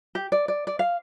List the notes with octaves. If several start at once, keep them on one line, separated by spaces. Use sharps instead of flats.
G4
D5
D5
D5
F5